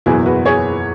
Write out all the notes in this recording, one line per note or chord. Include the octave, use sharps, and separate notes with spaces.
F#1 E2 B2 F#3 B3 E4 G#4
F#4 B4
G#4 C#5